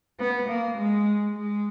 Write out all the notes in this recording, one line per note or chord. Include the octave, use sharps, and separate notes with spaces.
B3
A#3
G#3
G#3